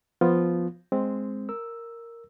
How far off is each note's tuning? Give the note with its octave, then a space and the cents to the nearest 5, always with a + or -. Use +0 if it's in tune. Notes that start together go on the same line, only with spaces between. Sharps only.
F3 +0 B3 +0 F4 +0
G#3 +0 C4 +0
A#4 -5 E6 +0